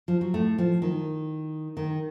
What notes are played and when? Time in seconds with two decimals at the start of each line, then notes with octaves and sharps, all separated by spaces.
0.08 F3
0.21 F#3
0.34 A2 A3
0.58 F3
0.82 D#3
1.77 D#3